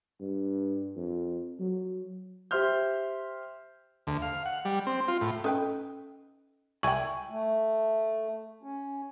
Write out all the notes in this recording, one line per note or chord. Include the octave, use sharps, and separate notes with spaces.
G2
F2
F#3
G4 C5 E5 C6 F6 G6
D2
F5
F#5
G3
C4
F4
A2
C#4 D#4 A4 B4 G5
C2 E4 D5 G5 G#5 C#6
A3
C#4